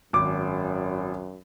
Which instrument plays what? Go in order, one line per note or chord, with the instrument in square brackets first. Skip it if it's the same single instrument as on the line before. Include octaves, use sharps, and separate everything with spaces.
[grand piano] G#1 D6 [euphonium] F#2